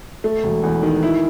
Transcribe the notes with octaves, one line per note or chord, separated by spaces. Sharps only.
A3
E1
E2
D#3
E4